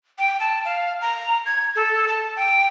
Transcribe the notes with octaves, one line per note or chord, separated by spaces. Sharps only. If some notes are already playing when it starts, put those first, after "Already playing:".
G5
A5
F5
A#5
G#6
A4
A5
G5